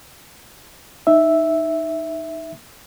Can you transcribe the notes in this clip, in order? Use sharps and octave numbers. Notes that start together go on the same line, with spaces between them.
D#4 E5